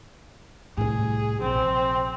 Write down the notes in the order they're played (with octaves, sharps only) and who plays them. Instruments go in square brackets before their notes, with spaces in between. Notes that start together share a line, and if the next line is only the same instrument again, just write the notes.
[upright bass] C2 A2 [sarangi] G#4
[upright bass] A#1 C3 [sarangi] C4